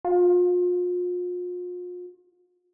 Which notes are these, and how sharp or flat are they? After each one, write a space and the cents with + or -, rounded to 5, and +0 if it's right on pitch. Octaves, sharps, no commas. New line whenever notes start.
F4 +40